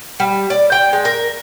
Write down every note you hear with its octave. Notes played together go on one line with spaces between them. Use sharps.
G3
D5
G5
G#3
A#4